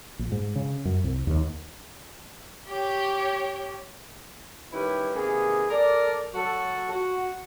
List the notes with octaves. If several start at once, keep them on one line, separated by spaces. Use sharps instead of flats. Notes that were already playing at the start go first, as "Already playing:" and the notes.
A#1
G#2
C#3
F#2
C2
D#2
G4 C#5
D#3 G3 C#4 E4 G4 B4
C3 D#3 A#3 B3 G#4
A4 A#4 D5
F#3 F#4 A4
F#4